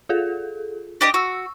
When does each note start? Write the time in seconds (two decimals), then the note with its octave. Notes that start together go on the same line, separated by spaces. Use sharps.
0.09 F4 G#4 A4
1.01 D4 G4 D#5
1.14 F#4 C#6 E6